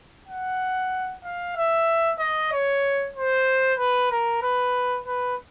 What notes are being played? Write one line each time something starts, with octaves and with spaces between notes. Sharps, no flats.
F#5
F5
E5
D#5
C#5
C5
B4
A#4
B4
B4